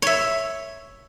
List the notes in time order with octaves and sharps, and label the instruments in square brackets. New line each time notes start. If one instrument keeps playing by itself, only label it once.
[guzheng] C#5 E5